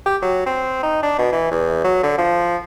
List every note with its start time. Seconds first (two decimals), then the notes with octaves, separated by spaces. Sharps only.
0.06 G4
0.22 F#3
0.46 C4
0.83 D#4
1.03 D4
1.19 B2
1.32 E3
1.51 E2
1.84 F#3
2.03 D3
2.18 F3